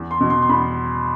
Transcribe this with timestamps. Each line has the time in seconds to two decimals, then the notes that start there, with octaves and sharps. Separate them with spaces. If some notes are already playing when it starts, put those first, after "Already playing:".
Already playing: E2
0.11 C6
0.21 B2
0.30 C6
0.42 C6
0.49 E2 B5